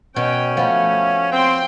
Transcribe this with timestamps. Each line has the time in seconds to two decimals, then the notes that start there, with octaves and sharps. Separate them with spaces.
0.16 B2 C#4 G5
0.57 F3 A3 B3
1.32 C4 G5 C6